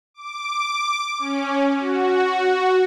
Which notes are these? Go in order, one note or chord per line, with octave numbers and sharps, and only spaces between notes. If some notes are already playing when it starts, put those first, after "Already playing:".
D6
C#4
F#4